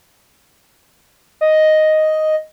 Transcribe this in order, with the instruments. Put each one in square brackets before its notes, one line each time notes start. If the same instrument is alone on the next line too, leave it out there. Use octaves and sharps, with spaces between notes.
[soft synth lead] D#5